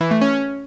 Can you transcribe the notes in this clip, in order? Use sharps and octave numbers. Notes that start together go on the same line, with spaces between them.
E3
A3
C#4